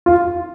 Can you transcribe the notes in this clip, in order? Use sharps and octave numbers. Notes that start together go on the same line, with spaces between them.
F4